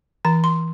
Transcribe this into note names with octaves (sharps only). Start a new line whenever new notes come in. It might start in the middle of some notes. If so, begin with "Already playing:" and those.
E3 A#5
C6